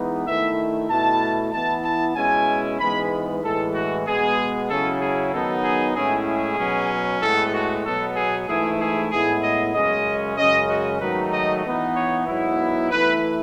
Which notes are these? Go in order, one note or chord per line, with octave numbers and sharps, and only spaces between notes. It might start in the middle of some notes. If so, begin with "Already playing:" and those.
Already playing: E3 G#3 B3 D#4
D#3 A3 E4 E5
B2 A3 E4 A5
E3 B3 E4 A5
A5
B2 G#3 C#4 E4 G#5
G#2 E3 G#3 B3 B5
A2 E3 G#3 A4
F#4
B2 G#3 B3 G#4
C#3 F#3 C#4 E4 A4
G#4
D#3 F#3 B3 D#4 A4
G#4
A2 G#3 C#4 E4 G#4
G#4
B2 F#3 C#4
A2 G#3 B3 A4
F#4
B2 F#3 B3 A4
G#4
G#2 E3 A3 E4 G#4
G#4
A2 G#3 B3 E4 G#4
D#5
F#2 C#3 G#3 C#4 D#5
F#2 C#3 G#3 C#4 D#5
F#4
G#2 D#3 F#3 A3 D#4 B4
D#5
E3 B3 D#4
C#5
G#2 F#3 B3 E4
E3 A3 E4 B4